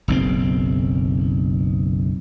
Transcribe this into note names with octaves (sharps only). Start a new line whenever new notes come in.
F#1 B1 C4